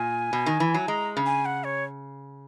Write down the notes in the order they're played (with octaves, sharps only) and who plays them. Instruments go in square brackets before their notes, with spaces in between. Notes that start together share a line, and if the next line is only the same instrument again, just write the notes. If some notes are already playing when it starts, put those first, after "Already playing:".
Already playing: [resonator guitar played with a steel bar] A#2 [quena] G#5
[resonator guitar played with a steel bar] B2
D#3
E3
F#3
[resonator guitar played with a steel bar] G#3 [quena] A#5
[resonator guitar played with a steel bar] C#3
[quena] G#5
F#5
C#5